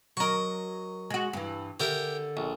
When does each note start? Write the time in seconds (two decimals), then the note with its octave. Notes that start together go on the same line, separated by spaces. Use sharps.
0.17 F#3 A#4 D#5 C#6
1.10 G#3 F#4
1.33 G2 E3
1.80 D3 G4 A#4 E5
2.37 A#1